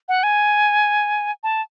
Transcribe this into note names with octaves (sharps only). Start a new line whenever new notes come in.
F#5
G#5
A5